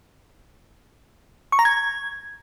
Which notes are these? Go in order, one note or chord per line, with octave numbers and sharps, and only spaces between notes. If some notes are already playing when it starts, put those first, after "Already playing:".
C#6
A#5
G#6